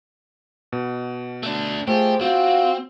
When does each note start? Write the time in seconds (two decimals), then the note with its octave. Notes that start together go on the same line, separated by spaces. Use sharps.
0.72 B2
1.43 A3 D4
1.88 A3 F4 G4 G#4 C5
2.21 C4 F4 F#4 F5